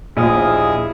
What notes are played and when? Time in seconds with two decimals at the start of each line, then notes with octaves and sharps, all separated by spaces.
0.17 A#1 D#2 E4 G#4 D#5 F5